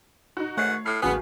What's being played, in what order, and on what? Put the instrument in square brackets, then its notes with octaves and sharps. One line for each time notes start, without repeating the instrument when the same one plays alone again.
[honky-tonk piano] D#4 F#4
[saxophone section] G#2 D#3 F#5 [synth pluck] A3 [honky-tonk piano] C#5 C7
[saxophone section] A2 [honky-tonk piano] F6 C7
[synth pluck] A1 F#4 G#5 [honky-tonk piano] D#2 C#3 G#3 [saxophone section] B3